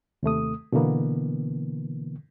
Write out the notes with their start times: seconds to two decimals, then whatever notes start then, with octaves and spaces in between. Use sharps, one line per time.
0.23 D#2 C3 A3 D#6
0.72 B2 D3 E3 A#3 B3